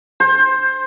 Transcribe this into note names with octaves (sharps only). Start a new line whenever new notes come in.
C5